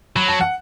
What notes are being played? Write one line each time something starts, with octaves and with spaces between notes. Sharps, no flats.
F#3 B5
A5
F#5